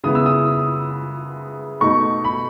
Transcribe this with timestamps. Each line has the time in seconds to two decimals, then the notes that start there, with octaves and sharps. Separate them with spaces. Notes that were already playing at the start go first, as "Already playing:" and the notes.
0.03 C#3 E3 B3 E4 D#6
0.15 E6
0.26 D#6
1.81 B2 A3 D#4 C#6
2.24 B5